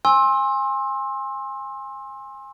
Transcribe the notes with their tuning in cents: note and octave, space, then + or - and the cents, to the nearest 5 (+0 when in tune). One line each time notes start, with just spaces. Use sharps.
G#5 -20 C6 +30 E6 -10